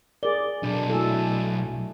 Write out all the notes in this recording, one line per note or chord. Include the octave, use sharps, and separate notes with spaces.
G#4 A#4 D5 G7
B1 D4
A3 E4 F#4 A4 G#5